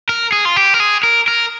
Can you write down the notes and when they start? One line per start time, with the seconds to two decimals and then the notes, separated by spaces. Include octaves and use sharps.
0.09 A#4
0.32 G#4
0.45 F4
0.56 G4
0.74 A#4
0.80 G#4
1.03 A#4
1.28 A#4